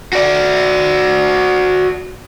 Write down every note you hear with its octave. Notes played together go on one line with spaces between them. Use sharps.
F#4 D5